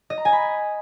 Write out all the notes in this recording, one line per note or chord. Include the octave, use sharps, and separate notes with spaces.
D#5
A#5
G#5
B5